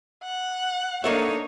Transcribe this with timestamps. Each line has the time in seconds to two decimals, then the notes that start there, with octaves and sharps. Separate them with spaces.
0.24 F#5
1.04 A#3 D4 D#4 A4 C#5 E5